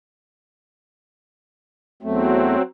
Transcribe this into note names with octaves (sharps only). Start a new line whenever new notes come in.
E2 F#3 A3 C4